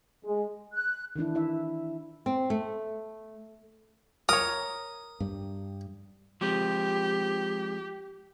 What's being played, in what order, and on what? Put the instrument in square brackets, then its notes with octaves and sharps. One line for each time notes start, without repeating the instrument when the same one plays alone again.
[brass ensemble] G#3
[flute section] F#6
[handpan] D#3 E3 D4 E4
E4 E5
[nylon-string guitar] C4
A3
[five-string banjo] A#4 C#5 [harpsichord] D#6
[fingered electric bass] G2 G3
[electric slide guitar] F3 G#3 C4 [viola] G4